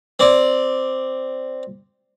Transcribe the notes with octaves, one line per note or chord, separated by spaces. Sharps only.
C4 D5